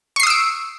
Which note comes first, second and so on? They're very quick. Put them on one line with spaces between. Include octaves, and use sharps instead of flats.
C#6 C7 D#6 E6 D7